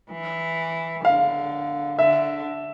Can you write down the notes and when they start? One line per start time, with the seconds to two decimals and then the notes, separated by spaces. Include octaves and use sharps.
0.11 E3
1.05 D3 F5
1.99 D3 E5